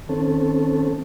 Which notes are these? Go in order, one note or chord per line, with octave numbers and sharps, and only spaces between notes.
D#3 C4 C#4 A4